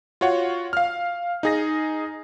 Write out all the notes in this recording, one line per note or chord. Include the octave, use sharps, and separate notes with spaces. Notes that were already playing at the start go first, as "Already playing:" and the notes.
F4 F#4 C#5 F#5
F5 F6
D#4 G#4 A#6